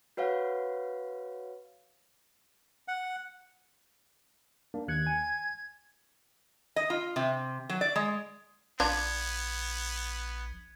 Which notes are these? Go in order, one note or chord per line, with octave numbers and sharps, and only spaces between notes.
F#4 B4 C#5 F5 F#5
F#5
A#3 D4
D#2 F#6 G#6 C#7
G#5
D#5
F4
C3
F#3
D5
G#3
A#1 B3 D4 F4 G#6